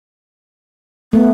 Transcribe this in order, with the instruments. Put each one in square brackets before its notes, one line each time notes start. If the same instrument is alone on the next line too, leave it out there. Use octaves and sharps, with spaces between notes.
[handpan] A3 [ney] B3